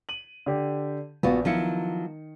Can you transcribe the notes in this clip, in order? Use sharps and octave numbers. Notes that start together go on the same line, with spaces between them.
D#7 F#7
D3 G4
A#1 B3 F4 F#4
D#3 F3 F#3 E4 C#7